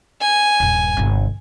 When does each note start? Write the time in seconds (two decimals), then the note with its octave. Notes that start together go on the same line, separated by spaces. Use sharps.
0.21 G#5
0.60 D#1 G2
0.97 G1 C3